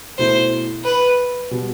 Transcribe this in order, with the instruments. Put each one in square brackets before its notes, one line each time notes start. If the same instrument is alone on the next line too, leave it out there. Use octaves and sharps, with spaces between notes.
[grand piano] B2 A3 E4 [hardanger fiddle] C5
[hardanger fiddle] B4
[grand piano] B2 G3